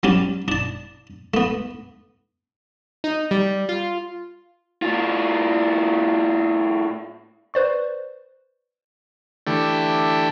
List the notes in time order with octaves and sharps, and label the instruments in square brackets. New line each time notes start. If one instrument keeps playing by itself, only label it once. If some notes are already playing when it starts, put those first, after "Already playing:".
[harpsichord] F#3 G3 C#4 D4
D4 A5
A3 B3
[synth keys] D#4
G3
F4
[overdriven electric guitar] A2 F4
[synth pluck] B4 C5 D5 C#6
[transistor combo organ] D3 E3 A3 G4